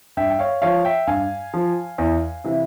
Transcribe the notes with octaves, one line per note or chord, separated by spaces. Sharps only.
G2 E5 G5
G5
C#5 F5
F3 C#5 F5
E5 G5
G2 F5 G#5
F3
E2
C3 E3